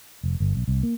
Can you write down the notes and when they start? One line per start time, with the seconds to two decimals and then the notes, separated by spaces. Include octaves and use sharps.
0.24 F1
0.40 G1
0.55 B1
0.68 C2
0.83 A#3